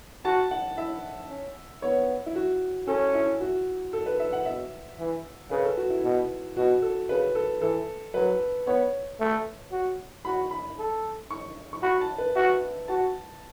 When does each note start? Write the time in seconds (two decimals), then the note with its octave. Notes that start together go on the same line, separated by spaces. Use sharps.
0.25 F#4 A5
0.51 F#5
0.77 E4 E5
1.30 C#4
1.82 B3 C#5
2.26 E4
2.36 F#4
2.88 C#4 A4
3.15 E4
3.41 F#4
3.93 A4
4.06 B4
4.20 E5
4.33 F#5
4.46 B2 E5
4.99 E3
5.51 C#3 B4
5.65 A4
5.77 F#4
5.90 E4
6.04 B2
6.57 B2 F#4
6.82 A4
7.09 C#3 B4
7.35 A4
7.62 E3 A4
8.14 F#3 B4
8.67 B3 C#5
9.20 A3
9.72 F#4
10.25 F#4 B5
10.51 B5
10.78 A4
11.30 C#6
11.73 C#6
11.82 F#4 B5
12.01 A5
12.18 B4
12.35 F#4 E5
12.88 F#4 A5